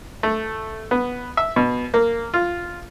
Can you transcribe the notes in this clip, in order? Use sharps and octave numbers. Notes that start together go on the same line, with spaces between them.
A3
B3
E5
B2
A#3
F4